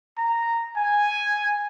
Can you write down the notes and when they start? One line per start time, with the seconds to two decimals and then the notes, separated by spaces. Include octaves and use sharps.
0.18 A#5
0.77 G#5